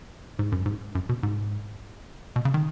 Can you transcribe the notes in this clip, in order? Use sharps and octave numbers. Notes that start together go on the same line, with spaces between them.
G#2
F#2
G#2
F#2
B2
G#2
B2
C#3
D#3